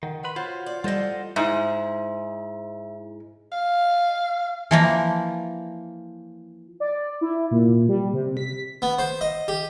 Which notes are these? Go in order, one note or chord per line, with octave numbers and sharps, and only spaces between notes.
D#3 F#5
B4 B5 C6
F4 F#4 C5 C#5 F#5
D5
E3 G3 F4 A4 C5 D#5
F#5
G#2 E4 E5
F5
E3 F3 A#3
D5
E4
A#2
G3
C3
B6
B3
C5
D#5
G4